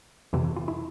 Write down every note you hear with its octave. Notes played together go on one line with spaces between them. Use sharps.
F2 C3 E3
F4
E4